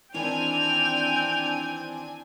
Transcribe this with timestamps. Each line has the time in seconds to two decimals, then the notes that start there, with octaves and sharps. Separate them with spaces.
0.14 D#3 E3 C4 D4 E4 G5 G#5 F7